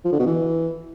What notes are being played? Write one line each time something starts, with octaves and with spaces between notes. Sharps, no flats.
F3
D3
B2
E3